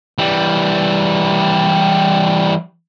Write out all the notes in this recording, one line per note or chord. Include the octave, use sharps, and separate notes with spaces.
E3 G3